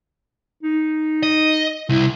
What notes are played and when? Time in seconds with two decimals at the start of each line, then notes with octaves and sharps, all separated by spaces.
0.63 D#4
1.23 D#5
1.89 C2 E4